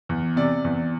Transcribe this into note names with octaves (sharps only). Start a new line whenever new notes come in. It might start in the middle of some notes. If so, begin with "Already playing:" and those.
E2
C3 D5
E2